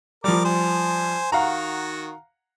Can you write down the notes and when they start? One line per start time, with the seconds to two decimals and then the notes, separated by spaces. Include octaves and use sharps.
0.24 F3 G3 A#4 D6
0.45 C5 G#5
1.32 D#3 F#4 F5 F#5 A#5